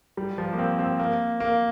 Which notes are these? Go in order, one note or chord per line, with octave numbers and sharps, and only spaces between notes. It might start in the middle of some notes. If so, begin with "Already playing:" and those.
G3
F3
A#3
C4
C4
A#3
A#3